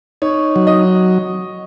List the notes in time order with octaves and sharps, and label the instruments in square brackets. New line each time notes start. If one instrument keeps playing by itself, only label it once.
[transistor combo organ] D#4 [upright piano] C#5
[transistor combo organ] F#3
[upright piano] D#5